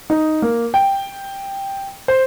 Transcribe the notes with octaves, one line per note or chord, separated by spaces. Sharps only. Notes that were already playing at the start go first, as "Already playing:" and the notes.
D#4
A#3
G5
C5